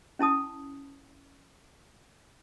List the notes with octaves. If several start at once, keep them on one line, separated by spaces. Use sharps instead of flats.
C#4 E4 A5 D#6